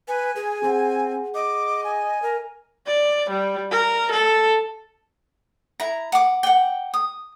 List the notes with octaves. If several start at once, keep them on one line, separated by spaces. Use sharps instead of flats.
B4 G#5
G#4
C4 G#4 F#5
D#5 D6
G#5
A#4
D5
G3
A#4
A4
E4 A#5
F#5 D6
F#5 G5
D#6